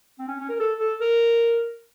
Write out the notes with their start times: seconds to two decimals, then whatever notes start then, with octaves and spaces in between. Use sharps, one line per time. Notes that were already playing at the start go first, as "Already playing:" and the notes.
0.19 C4
0.28 C#4
0.40 C#4
0.49 A#4
0.60 A4
0.80 A4
1.01 A#4